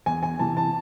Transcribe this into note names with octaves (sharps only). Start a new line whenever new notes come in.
E2 G#5
G#5
C3 E3 A5
A5